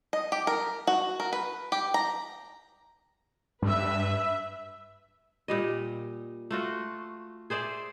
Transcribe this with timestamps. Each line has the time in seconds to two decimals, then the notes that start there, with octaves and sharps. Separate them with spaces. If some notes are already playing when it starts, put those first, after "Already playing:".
0.13 D#5
0.32 G4
0.47 A#4
0.87 F#4
1.20 A#4
1.33 B4
1.72 G4
1.94 A#5
3.62 G2 B4 E5
5.48 A#2 G3 D#5
6.51 A3 F4 F#4
7.50 G#4 C5 D5 E5